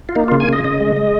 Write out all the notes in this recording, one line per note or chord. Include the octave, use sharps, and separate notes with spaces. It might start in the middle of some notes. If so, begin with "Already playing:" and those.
F4
A#3 D#4
C#3 F4
G#5
C#3 D#5
C#3 D#5
G#3
G#3